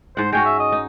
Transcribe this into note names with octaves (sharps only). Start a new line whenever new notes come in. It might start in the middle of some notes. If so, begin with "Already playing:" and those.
G#2 C5 F#5
G#3 C#4 F#4 G5
E5
D#5
D#4